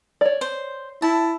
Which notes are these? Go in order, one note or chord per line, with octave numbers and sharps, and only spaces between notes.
C#5 D5
C5
E4 A5